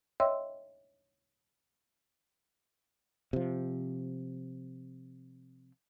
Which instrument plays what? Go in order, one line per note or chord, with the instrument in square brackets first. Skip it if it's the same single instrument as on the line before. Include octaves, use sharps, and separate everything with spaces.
[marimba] C#5 D#5 E5 G5 C6 E6
[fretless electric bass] C3 F3